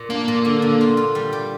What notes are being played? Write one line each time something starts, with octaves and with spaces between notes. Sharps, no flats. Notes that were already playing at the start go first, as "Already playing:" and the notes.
Already playing: A#2
A#3 D4
A#2
D3
D3
F4
F4
G3
G4